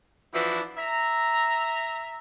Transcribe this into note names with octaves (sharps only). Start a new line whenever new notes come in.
E3 F3 D4 E4 F#4
E5 A#5